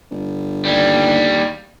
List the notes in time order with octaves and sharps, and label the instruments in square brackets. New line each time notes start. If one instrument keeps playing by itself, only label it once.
[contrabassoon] G1
[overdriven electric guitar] D#2 G3